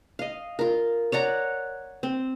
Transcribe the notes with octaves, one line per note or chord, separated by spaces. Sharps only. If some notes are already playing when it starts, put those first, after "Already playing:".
D#5 F5
F4 A#4
C#5 D5 F#5 A#5
C4